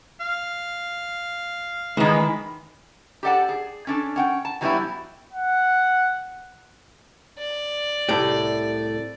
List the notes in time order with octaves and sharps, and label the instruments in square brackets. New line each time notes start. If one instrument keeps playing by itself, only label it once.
[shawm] F5
[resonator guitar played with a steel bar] D#3 E3 [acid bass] G#3 [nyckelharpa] B5
[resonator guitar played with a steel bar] G4 A4 D5 F#5 A5
G#4
C#4 D4 A4
C#4 F#5 G5
A5
E3 F#3 G3 B3 C#4 E4
[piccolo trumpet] F#5
[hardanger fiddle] D5
[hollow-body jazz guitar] C2 A2 G4